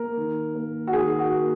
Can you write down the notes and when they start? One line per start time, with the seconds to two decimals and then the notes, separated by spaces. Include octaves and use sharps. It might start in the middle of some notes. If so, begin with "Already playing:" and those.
Already playing: A#3 A#4
0.17 D#3
0.55 A#3
0.87 F#4
0.93 D#3 G#4
1.19 F#4
1.32 A#3